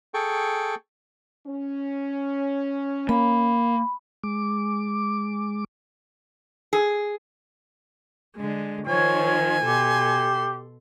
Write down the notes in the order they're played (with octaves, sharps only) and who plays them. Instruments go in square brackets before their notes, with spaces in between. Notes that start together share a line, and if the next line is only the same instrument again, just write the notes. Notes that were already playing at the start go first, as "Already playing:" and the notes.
[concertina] G#4 A4 G5 C#6
[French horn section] C#4
[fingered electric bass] A#3 [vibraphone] B5
[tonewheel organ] G#3 D6
[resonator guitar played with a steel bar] G#4
[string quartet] D3 G#3
[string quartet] D#3 F3 [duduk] C#5 [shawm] G#5
[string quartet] B2 A4 C6 [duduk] G4